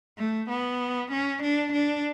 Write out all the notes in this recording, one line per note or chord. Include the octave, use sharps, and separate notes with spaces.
A3
B3
C#4
D4
D4